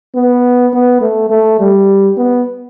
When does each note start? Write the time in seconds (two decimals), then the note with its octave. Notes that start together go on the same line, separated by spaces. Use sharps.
0.16 B3
0.74 B3
1.01 A3
1.30 A3
1.60 G3
2.17 B3